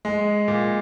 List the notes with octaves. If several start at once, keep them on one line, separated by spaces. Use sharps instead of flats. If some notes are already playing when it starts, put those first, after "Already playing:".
G#3
A#2